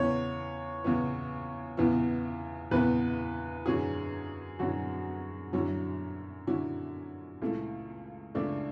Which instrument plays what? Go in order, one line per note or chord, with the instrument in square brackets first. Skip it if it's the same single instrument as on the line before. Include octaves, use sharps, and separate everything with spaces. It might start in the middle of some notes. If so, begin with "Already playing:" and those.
Already playing: [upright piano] E2 C#3 E3 B3 E4 [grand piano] C#5
[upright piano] E2 C#3 E3 B3 E4
E2 C#3 E3 B3 E4
[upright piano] E2 C#3 E3 B3 E4 [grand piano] B4
[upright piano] F#2 D3 F#3 C#4 E4 [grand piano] G#4
[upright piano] F#2 D3 F#3 C#4 E4 [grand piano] F#4
[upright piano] F#2 D3 F#3 C#4 E4
F#2 D3 F#3 C#4 E4
C#2 C#3 E3 A3 E4
[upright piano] C#2 C#3 E3 A3 E4 [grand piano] D4